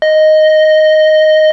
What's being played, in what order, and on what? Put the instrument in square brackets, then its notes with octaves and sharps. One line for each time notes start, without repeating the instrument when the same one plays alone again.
[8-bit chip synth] D#5